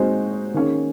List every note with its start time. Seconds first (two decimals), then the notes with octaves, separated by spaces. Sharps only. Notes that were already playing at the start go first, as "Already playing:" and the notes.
Already playing: G#3 C4 D#4 F#4 C5
0.54 D#3 A#3 C#4 G#4